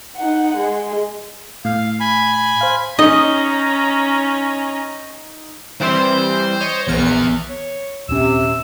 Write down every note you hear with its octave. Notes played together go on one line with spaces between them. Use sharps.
D#4 F#5
G#3
A2 F5
G#5 B5
C5 F5
C#4 D#4 D#5 A#5
E3 G3 C4 C5 C6
C#5 D#5
A#1 E2 B3 F6 C#7
C#5
D#1 C3 C#4 E6